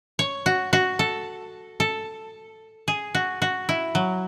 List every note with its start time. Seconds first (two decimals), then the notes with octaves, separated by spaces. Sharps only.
0.19 C#5
0.46 F#4
0.73 F#4
0.99 A4
1.80 A4
2.88 G#4
3.15 F#4
3.42 F#4
3.69 E4
3.95 F#3